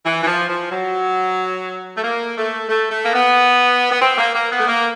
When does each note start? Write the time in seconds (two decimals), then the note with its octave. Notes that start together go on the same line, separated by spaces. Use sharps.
0.05 E3
0.23 E3
0.27 F3
0.49 F3
0.71 F#3
1.96 A3
2.03 A#3
2.36 A3
2.69 A3
2.91 A3
3.04 A#3
3.13 B3
3.91 B3
4.01 C4
4.18 A#3
4.34 A#3
4.51 B3
4.60 A3
4.67 A#3